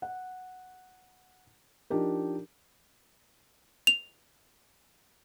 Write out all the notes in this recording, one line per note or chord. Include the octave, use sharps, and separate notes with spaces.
F#5
F3 D4 D#4 G4 A#4
F7